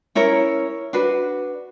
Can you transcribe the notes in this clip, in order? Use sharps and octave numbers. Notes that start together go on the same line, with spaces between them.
C#4 E4 A#4 C#5
D4 F#4 B4